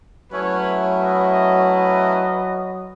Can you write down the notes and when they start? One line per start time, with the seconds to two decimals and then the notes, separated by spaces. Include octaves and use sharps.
0.32 F#3 A3 C#4 E4 B4 C#5
1.01 B4 D#5